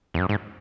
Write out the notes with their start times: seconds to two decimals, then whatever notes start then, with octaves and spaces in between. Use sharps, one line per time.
0.14 E2
0.19 F#2
0.29 G#2